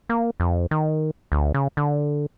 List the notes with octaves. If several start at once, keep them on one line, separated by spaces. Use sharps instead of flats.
A#3
F2
D#3
D2
C#3
D3